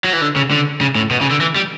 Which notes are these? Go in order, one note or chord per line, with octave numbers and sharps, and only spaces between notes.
F#3
E3
D3
C#3
D3
C#3
A2
B2
C#3
D3
E3
G3